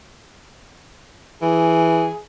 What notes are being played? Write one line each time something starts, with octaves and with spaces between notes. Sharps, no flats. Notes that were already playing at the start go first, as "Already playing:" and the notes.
E3 G#4